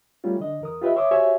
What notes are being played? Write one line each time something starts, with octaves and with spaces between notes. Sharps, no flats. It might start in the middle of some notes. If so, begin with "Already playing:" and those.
F#3 G3 A3 C#4 F4
D3 D#5
E2 A#4 D#6
F4 G4 B4 D#5 E5
C#5 E5 C6 D6 D#6
F#4 G4 C5 C#5 E5 G#5